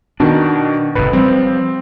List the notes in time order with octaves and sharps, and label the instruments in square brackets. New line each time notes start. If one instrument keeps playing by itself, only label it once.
[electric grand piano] B2 D#3 [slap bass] D4
[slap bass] F1 A2 [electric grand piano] B4
[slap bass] F3 G3 [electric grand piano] C4